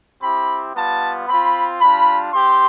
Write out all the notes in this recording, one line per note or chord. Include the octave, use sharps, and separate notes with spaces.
C4 E4 G4 B5
G3 B3 F4 A5
C4 F4 B5
G3 D4 F4 B5
C4 G4 C6